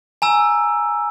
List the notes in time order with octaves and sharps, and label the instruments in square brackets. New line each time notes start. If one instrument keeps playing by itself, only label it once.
[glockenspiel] G#5 A#5 E6